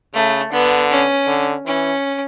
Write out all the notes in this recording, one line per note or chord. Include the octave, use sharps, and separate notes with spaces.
C#3 A3
D3 B3
C#4
D3
E3 C#4